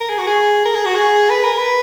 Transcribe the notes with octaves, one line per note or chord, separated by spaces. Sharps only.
A#4
G#4
F#4
G#4
A#4
G#4
F#4
G#4
B4
A#4
B4